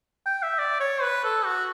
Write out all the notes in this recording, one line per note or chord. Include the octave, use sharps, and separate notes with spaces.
G5
E5
D5
C#5
B4
A4
F#4